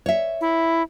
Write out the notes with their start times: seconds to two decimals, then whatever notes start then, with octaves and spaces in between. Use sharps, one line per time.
0.06 C#5 E5
0.41 E4